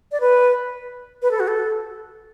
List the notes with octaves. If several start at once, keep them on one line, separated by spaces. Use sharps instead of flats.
D5
B4
B4
A4
F#4
A4